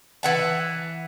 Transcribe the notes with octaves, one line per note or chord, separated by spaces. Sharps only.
E3 F#5 A5